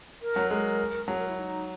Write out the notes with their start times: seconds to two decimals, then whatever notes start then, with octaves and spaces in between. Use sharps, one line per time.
0.21 A#4
0.36 F#3
0.51 G#3 A#4
1.08 F#3 G#4
1.18 A#4
1.28 E4
1.37 D#4